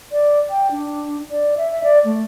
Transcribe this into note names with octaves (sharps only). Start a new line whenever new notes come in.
D5
G5
D4
D5
E5
D5
A3